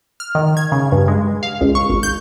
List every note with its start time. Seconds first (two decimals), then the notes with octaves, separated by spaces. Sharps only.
0.20 F6
0.35 D#3
0.57 G#6
0.72 C#3
0.92 G2
1.08 G#3
1.43 F5
1.61 C#2
1.75 C#6
1.89 G#1
2.03 G6